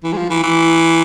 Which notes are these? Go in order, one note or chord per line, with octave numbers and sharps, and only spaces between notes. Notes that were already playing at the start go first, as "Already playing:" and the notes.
E3
G#3
F3
E3
E3